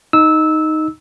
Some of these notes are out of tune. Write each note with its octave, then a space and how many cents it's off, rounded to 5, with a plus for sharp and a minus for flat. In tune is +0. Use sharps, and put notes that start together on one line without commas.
D#4 +0 E6 -15